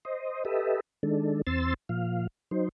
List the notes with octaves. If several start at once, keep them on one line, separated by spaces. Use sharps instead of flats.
C5 D#5
G4 A4 B4 D#5 E5
D#3 G#3 D4 A4
E2 C4 C6 E6 A6
A#2 F3 F5
F#3 D#4 C5